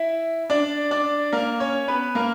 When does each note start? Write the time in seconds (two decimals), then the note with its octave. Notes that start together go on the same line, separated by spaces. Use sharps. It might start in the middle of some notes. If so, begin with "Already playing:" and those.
Already playing: E4 E5
0.50 D4 D5
0.91 D4 D5
1.32 A#3 A#4
1.60 C#4 C#5
1.88 B3 B4
2.15 A#3 A#4